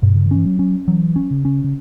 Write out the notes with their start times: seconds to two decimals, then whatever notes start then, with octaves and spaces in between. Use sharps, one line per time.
0.02 G2 B2
0.16 C#3
0.26 D3
0.31 E3 C#4
0.45 F#3
0.59 C#4
0.88 E3 F#3
1.16 C#4
1.31 C#3
1.45 C#4
1.64 C#3